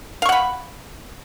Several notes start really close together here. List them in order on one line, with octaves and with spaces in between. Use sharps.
F5 C#6 F#5 B5